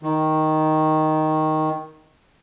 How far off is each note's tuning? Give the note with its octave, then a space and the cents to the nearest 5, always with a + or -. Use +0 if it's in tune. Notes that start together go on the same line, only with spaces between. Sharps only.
D#3 +5